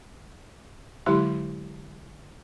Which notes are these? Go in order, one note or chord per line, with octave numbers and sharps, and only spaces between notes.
D3 F#3 G#3 E4 G4 C6